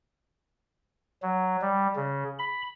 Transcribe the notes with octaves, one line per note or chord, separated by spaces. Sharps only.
F#3
G3
C#3
B5